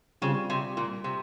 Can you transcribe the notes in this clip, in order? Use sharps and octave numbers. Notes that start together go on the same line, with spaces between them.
C#3 G3 C4 F4
C3
A#2
C3